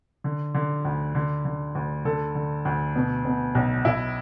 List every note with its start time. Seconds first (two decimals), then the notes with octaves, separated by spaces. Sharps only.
0.24 D3
0.54 D3
0.85 D2
1.15 D3
1.45 D3
1.75 D2
2.05 D3 A4
2.35 D3
2.65 D2
2.96 B2
3.25 B2
3.55 B1
3.85 B1 E4